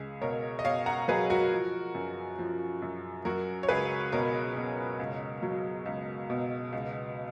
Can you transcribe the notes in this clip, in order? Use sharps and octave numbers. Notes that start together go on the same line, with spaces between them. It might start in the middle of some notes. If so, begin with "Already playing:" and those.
Already playing: C#2 G#4
B2 A#4 C#5
D#5
B2 C#5 F5
F#5 A#5
F#3 G#4 B4
F#4 A#4
F3
F#2
F3
F#2
F#3 F#4 A#4
C#5
C#2 G#4 B4
B2 A#4 C#5
B2
C#2
F#3
C#2
B2
C#2